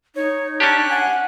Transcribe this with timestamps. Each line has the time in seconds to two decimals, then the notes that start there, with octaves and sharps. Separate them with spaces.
0.16 D#4 C#5
0.60 C#4 D4 G4 A5 F#6
0.90 F#5 G#5